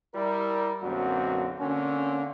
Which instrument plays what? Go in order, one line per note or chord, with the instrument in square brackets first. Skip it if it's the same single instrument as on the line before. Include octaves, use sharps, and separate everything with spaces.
[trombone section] G3 E4 A#4
B1 F#2 D3 A#3 C4 F#4
D3 A#3 C4 C#4